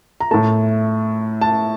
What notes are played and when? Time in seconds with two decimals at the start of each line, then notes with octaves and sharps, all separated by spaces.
0.20 A#5
0.31 A2 A3 A5
1.41 A5